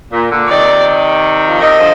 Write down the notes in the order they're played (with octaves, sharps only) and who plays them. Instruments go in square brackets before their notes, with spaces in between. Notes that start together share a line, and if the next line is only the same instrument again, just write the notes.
[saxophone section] A#2
A#2 D3
[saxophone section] C3 D#3 [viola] D5
[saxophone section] F3
[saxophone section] C3 D#3 [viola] D#5
[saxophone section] D3 F3